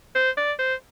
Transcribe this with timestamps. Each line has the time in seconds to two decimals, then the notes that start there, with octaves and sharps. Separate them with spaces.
0.15 C5
0.37 D5
0.59 C5